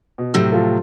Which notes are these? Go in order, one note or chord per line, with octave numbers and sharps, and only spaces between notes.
B2
A2 C3 F#3 E6
F3 F4 A4